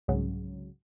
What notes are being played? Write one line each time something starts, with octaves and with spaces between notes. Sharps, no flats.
C2 G#2 C#3 F#3